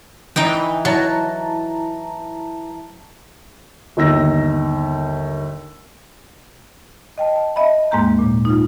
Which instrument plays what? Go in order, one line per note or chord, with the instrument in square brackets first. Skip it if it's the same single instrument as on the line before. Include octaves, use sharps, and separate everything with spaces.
[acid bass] E3 [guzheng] D#4 D#5 G5
[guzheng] F#3 [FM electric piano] E4 A5 A#5
[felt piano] G1 D#2 D#4 E6 A#6
[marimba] D#5 G5 A5
A5
D#5 E5 A5 B5
D#2 G#2 G#3 A#3 A#5 G6
A#2
D#4 F4